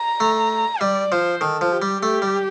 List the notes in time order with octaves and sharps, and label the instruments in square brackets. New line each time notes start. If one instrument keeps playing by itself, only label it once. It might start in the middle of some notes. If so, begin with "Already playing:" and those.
Already playing: [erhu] A#5
[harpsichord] A3
[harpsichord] G3 [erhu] D5
[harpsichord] F3 [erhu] C5
[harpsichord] D#3 [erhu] A4
[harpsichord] F3
[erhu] G4
[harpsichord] G3
[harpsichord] A3 [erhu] G4
[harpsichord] G3